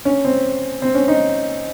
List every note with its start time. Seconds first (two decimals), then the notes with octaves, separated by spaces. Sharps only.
0.05 C#4
0.25 C4
0.82 C4
0.95 C#4
1.08 D#4